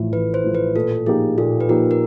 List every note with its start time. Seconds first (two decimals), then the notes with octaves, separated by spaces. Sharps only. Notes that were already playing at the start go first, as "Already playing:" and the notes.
Already playing: A1 A2 F3 A3
0.13 A1 B4
0.34 C5
0.44 A2 F3 A3
0.55 B4
0.75 A#2 A4
1.06 F3 A#3 D#4 G4 G#4
1.37 A#2 A4
1.60 B4
1.69 F3 A#3 D#4 G4 A#4
1.91 A#4